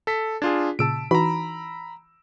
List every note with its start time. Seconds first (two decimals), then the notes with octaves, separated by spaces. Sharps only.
0.07 A4 B6
0.42 D4 F4 G#4 G#6
0.79 A#2 C#3 A5 E6 D7
1.11 E3 D#4 F#4 A#5 B5